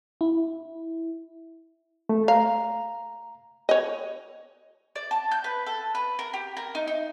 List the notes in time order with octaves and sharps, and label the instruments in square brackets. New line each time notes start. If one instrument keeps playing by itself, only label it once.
[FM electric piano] E4
[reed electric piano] A3
[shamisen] F5 [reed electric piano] A#5
[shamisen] C#5 D#5
[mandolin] D5
A5
G6
B4
A4
B4
A#4
G4
A#4
D#4
D#4